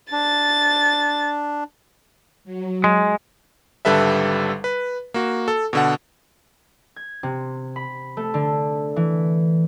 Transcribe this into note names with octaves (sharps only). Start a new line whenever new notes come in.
D4 A6
F#3
G#3
G#1 D3 G3 A4 B4 E5
B4
A#3 F#4
A4
B2 D3 F#5
G#6
C3
B5
A3
D3
E3